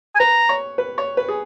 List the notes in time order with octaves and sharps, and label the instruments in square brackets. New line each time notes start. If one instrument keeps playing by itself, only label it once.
[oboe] G#5
[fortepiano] B4 [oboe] A#5
[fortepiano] C#5
B4
C#5
B4
G#4